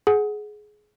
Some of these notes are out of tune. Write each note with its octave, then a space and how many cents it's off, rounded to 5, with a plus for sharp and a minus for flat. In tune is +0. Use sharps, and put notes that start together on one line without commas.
G#4 +20 F#5 +0